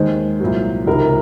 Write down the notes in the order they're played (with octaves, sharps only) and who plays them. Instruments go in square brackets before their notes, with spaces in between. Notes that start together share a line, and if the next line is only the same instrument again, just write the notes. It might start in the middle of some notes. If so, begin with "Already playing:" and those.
Already playing: [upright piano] D#2 D#3 G#3 C5
C2 A#2 F#3
C#2 C3 D#3 A#4